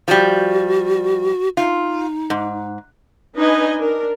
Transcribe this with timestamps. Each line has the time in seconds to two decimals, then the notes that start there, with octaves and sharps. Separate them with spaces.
0.08 F3 G3 F#4
1.57 D#4 F4
2.30 G#2
3.38 D4 D#4 B4 D#5 G#5
3.78 D4 A#4